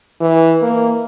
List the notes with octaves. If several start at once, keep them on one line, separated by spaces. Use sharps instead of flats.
E3
A#3